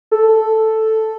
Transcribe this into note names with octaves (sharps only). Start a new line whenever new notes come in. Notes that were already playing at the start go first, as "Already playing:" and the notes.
A4